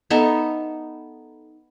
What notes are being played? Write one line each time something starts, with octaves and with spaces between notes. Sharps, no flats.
B3 D#4 A4 E5